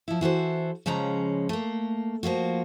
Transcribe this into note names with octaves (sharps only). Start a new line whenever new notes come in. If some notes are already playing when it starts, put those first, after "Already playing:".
F3 E4
E3 F#4 A4 C5
C#3 F3 G#3 C#4 A#5
A3 A#3
F3 A#3 F4 F#4